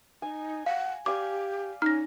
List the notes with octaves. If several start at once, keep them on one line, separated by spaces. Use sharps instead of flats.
D#4 G#5
F5 F#5
G4 D5 F5 G#5 D6
C#4 D#4 F6 A#6